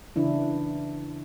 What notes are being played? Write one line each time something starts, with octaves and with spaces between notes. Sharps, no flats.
C#3 E3 D4 E4